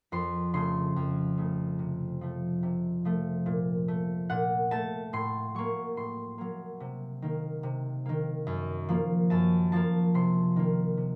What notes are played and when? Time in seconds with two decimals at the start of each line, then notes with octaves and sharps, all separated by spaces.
0.12 F2 C6
0.54 C#3 A3 C6
0.96 F2
1.37 C#3 A3
1.79 C3
2.21 F3 A3
2.63 C3
3.05 F3 A3
3.46 A#2
3.88 A3
4.30 A#2 F#5
4.71 A3 A5
5.13 A2 C6
5.54 F#3 A#3 C#6
5.97 A2 C6
6.38 F#3 A#3
6.80 C3
7.22 D#3 A#3
7.63 C3
8.06 D#3 A#3
8.47 F#2
8.89 F3 A#3
9.30 F#2 A5
9.72 F3 A#3 A5
10.14 C3 C6
10.56 D#3 A#3
10.97 C3